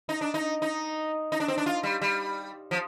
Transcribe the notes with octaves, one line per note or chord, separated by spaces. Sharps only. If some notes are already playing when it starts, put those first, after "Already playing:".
D#4
D4
D#4
D#4
D#4
D4
C4
D4
F4
G3
G3
F3